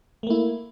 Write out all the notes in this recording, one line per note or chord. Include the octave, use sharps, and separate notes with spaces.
A3 A#3 E4